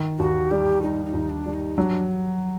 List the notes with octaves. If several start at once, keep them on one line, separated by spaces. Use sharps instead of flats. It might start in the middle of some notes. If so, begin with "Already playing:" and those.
Already playing: D#3
D#2 F#4
G3 G4
G3 D#4
D#4
D#2
D4
G3
D#4
F#3 D4